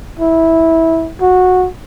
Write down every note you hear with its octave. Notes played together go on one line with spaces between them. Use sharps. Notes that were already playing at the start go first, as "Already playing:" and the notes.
E4
F#4